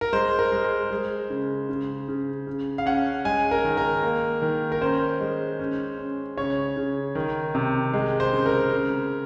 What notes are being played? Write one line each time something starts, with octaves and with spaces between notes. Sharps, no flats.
A#4
G#3 C5
A#4
G#3
C5
G#3
C#3
C#3
C#3
C#3
F5
C#4 F#5
G#3 G#5
A#4
D#3
A#4
A#3
D#3
A#4
C#4 C5
G#3
C#4
C#4
C#3 C#5
C#3
D#3
C3
G#3
C5
C#3
A#4
C#3